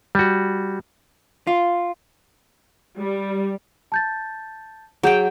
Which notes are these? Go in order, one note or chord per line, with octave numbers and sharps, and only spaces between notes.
G3 F#4
F4
G3
A5 G6 A6
F#3 G#4 G5 G6